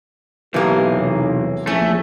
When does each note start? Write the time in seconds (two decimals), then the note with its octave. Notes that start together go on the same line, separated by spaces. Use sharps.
0.54 B1 E3 A#3 G4
0.91 E2 C3 C#5
1.67 A#1 E2 A3 C#4